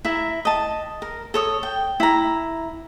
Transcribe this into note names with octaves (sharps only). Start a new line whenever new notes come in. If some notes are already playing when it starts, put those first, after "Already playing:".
E4 E5 A#5
D#5 A5
A#4
A4 C#5 D#6
G5
E4 A#5